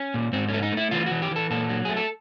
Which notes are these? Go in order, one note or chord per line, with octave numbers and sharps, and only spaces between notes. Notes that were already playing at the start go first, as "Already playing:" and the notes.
Already playing: C#4
A#2
G#2 C4
A3 C#4
D#4
A3
E4
E3 F4
F#4
E3
G4
E3 A4
A#2 A4
F#3
A3 G#4
A4